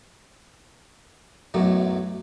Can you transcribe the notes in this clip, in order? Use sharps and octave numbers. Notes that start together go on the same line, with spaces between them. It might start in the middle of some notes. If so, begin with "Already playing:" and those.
B1 F#2 A2 F#3